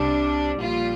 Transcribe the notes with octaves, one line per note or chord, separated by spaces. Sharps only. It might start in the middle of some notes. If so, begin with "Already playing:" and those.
Already playing: C2 C3 G3 D4
A#1 A#2 G3 F4